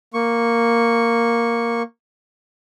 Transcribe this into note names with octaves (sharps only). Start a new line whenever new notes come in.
A#3 C#6